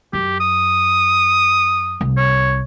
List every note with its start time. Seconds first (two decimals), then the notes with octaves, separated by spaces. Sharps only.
0.13 F#2 G4
0.40 D#6
2.01 C2
2.17 C#5